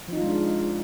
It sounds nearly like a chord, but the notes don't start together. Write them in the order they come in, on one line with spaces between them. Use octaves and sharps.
F3 D#4 F4 G#3 D4